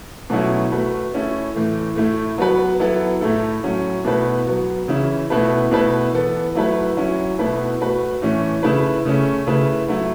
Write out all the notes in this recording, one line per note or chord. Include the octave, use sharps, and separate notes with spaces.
B2 F#3 A3 C#4 E4
A3 F#4 B4
A3 C#4 E4 A4
A2 E3 A3
A2 A3 E4
F#3 B3 F#4 B4
F#3 B3 E4 A4
A2 A3 E4 A4
A2 F#3 C#4
B2 A3 E4 B4
F#3 B3 F#4
C#3 E3 C#4 E4
B2 A3 E4 B4
B2 A3 E4 B4
E3 B3 A4
F#3 A3 E4 B4
F#3 C#4 E4
B2 A3 E4 B4
A3 F#4 B4
A2 E3 A3 C#4
C#3 A3 E4 B4
C#3 A3 C#4
C#3 A3 E4 B4
F#3 A3 E4